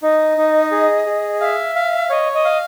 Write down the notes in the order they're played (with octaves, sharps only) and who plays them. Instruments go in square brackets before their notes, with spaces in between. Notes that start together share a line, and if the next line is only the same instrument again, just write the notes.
[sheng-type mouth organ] D#4 [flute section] D#5
[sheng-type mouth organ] D#4
G#4
G#4
[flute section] E5 [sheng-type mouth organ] F5
[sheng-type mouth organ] F5
[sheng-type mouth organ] C#5 [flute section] D#5
[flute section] D#5
[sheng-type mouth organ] F5